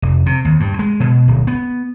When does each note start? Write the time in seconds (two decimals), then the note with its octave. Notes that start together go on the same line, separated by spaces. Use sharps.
0.02 F1
0.26 C3
0.45 D#2
0.60 G2
0.79 G#3
1.00 B2
1.28 D1
1.47 B3